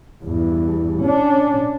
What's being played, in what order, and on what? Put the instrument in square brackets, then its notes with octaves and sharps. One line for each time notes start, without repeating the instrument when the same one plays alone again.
[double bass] E2 G2
C#4 D4